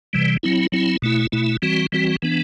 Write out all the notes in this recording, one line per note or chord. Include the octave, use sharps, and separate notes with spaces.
C3 E3 G3
F#3 C4 E4
F#3 C4 E4
B2 A3 E4
B2 A3 E4
E3 G3 C4 F#4
E3 G3 C4 F#4
E3 B3 D4